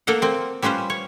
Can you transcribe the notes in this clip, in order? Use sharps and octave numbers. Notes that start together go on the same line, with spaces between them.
A#3 A4 F5 F#5
A#3 C4
G3 C#4 F4 B4 C5
C#5